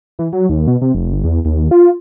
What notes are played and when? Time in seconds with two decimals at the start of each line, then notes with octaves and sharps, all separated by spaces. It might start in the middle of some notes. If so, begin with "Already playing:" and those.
0.19 E3
0.33 F#3
0.50 D#2
0.67 B2
0.82 C3
0.95 F1
1.12 G1
1.24 E2
1.45 D#2
1.71 F4